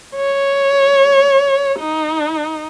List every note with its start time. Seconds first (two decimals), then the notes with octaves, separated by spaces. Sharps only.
0.16 C#5
1.80 D#4